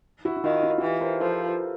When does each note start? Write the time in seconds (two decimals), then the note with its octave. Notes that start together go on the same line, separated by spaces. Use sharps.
0.25 E4 F#4
0.37 E4
0.44 D#3 D#4 F4
0.63 E4 F#4
0.78 F#4
0.82 E3 F4 G4
1.00 A#4 C5
1.20 F3 A4 B4